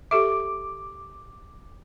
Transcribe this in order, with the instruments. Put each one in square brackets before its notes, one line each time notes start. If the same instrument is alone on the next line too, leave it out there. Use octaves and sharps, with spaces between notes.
[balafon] G4 A4 E5 [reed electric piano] D6